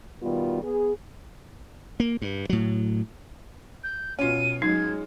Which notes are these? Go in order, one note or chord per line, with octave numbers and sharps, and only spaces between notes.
B2 D#3 G3 B3 F4
B3 G#4
A#3
G2
A2 F#3
G6
B2 C#4 F4 D#7
F#3 G#3 D#4 G#6